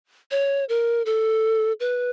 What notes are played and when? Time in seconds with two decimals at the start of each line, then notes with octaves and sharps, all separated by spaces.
0.31 C#5
0.69 A#4
1.06 A4
1.80 B4